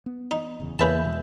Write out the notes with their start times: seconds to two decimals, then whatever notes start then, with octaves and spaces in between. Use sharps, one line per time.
0.06 B3
0.31 D#4
0.60 D1 E2 C#3
0.79 E2 C#3 A#3 B4 E5 A5 G6
1.05 B2 G#3